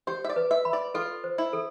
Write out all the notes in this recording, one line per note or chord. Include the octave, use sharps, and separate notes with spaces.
G4 C5
E5
D5
B4
E5
B5
D5
F4 A4
C5
E4
A4